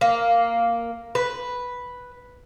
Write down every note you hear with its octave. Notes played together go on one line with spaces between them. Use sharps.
A#3
B4